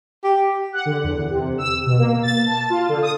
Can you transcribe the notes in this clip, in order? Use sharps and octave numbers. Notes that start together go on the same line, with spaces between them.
G4
F#5
D3
E2
C3
E6
B2
A#3
A6
A5
F4
D3
D#6